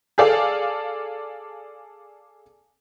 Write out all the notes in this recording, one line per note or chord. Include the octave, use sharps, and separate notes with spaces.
G#4 A4 D5 F5